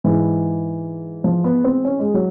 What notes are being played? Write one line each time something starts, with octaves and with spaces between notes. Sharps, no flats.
G#2 E3
F3
B3
C4
C#4
G#3
F#3